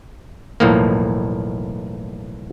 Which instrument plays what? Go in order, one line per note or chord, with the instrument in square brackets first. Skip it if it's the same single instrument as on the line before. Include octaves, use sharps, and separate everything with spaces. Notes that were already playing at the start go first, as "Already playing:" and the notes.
[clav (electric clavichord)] B1 E2 A2 F3 A#3